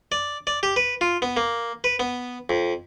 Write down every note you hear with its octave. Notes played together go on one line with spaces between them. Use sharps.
D5
D5
G4
B4
F4
B3
A#3
B4
B3
F2